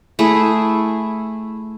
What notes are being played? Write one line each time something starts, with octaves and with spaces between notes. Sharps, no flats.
A3 E4 G#4